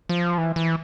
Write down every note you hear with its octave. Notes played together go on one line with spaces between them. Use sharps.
F3
E3
E3